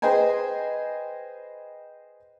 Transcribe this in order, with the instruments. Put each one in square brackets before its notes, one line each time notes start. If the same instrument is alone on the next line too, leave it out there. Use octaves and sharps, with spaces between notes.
[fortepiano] G#4 B4 C5 D#5 G5 G#5